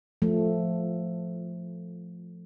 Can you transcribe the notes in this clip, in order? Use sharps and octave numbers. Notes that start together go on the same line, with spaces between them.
F3 A3